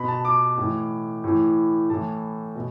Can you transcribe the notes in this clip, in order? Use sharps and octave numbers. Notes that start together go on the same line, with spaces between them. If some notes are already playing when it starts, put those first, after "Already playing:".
Already playing: B2 B5
A5
D6
A2 E3
A2 E3
A2 E3 A5
B2